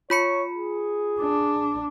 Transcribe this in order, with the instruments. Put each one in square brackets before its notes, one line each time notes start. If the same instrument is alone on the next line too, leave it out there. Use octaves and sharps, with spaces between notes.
[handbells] F4 B5 C#7 [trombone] C#5
[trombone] G#4
[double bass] D4